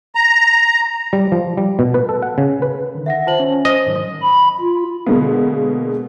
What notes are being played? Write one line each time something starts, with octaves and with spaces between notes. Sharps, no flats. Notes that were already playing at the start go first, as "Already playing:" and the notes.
A#5
G3
F3
G3
B2
B4
A4
F#5
C#3
B4
D3 D#3
E5 F#5 A#6
F4 C5 A5 F#7
C#4
C5 D#5
G#2 D#3 F#3
B5
F4
B2 D3 G#3 A#3 B3